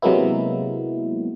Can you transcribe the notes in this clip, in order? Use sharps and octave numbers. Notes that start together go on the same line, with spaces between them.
C3 F#3 G#3 A#3 B3 E4